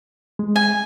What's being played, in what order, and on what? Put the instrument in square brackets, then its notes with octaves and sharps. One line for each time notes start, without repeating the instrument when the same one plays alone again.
[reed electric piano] G#3
[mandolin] G#5